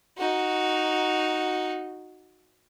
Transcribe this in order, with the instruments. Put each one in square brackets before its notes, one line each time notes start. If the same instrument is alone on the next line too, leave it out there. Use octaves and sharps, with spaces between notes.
[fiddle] D#4 F#4